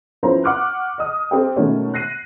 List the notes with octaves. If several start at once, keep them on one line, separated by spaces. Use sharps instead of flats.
F3 B3 C#4 E4 C5 A#5
F#5 C#6 D6 F6 F#6
D#5 D#6
C4 G4 A4 G5
B2 D#3 G#3 A3 C#4
F#6 A#6 C7 D#7